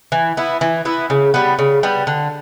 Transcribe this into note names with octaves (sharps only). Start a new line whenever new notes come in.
E3
B3 E4
E3
B3 E4
C#3
G3 B3
C#3
G3 B3
D3